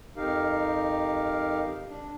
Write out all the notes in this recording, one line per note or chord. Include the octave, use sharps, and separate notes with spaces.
F2 D#4 G4 A#4 F5
D4